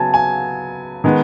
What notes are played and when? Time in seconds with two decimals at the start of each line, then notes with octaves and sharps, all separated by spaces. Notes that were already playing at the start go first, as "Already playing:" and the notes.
Already playing: C#3 F#3 B3 G#5 A5
0.14 G#5
1.04 D#3 G#3 B3